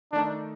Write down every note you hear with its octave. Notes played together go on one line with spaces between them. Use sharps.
D#3 A3 D4 D#4